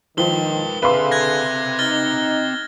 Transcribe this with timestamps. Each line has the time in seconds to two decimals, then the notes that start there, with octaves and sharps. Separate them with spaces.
0.18 D#3 F3 B4 G5 G7
0.83 D3 C4 G#4 A4 B4 E5 F5 C6
1.11 F#6 G#6 A#6
1.79 D#4 F6 A6 G7